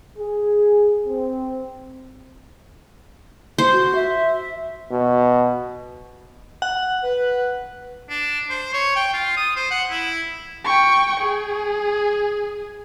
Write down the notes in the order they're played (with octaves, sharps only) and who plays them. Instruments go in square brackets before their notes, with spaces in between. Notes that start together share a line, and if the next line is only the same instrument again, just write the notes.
[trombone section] G#4
C4
[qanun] C5
[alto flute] F#4
E5
[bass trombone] B2
[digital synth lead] F#5
[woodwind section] B4
[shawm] D4
C5
C#5
G5
F4
D#6
C5
F#5
E4
[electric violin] G5 C#6
G#4